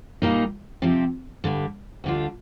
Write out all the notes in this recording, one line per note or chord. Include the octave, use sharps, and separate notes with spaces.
A#2 G3 A#3 D#4
C3 F3 C4 G4
G2 D3 G3
D2 D3 G3 D4 F4